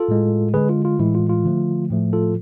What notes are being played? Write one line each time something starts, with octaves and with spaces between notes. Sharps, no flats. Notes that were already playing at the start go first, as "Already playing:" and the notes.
Already playing: F4 A4
A2 G#3
D3 G#3 G#4 B4
F4
F4
A2 E3 G#3 E4
F4
F4
D3 F3 A3
A2 F3 A3
F4 A4